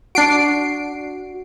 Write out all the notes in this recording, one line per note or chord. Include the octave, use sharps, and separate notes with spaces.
D4 F#4 C7 D7